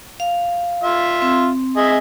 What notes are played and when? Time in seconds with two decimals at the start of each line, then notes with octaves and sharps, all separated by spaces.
0.20 F5
0.84 F4 E5
1.22 C4
1.77 G#4 D#5 E5